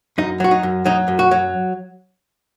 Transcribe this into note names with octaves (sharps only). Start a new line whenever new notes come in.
F#2 D#4
F#3 F#4
D#4
F#2
F#3 D#4
F#2
F#4
F#3